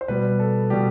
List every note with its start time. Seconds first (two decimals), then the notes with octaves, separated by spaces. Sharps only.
0.01 C5
0.08 B2 G3 B4
0.39 A4
0.70 B2 G3 G4